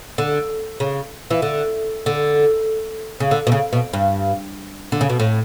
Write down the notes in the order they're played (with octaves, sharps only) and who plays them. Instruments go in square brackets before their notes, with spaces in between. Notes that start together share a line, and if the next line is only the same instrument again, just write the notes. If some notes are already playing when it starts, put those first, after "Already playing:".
[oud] D3
C#3
E3
D3
D3
C#3
D3
B2
C#3
B2
G2
D3
C#3
B2
A2